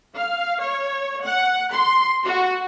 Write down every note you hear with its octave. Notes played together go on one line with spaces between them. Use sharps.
F5
C#5
F#5
C6
F#4